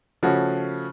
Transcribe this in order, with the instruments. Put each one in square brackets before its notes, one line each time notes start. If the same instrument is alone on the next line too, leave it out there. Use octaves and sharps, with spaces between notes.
[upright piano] C#3 F3 A3 C#4 F#4